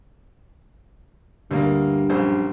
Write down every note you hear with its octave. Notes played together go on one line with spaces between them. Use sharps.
D2 G2 A#3 A#4
A#1 F#2 C5